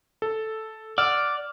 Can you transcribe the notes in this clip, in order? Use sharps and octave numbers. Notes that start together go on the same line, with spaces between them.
A4
D5 F#5 E6 F6